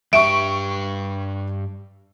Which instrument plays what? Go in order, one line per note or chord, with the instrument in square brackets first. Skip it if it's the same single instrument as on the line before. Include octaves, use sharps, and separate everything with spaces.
[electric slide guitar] G2 G4 [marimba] E5 [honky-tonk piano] C#6 D7